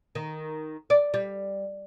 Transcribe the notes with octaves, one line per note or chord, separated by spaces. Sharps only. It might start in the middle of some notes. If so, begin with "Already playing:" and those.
D#3
D5
G3